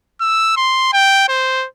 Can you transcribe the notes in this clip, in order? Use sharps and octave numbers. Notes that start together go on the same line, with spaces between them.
E6
C6
G5
C5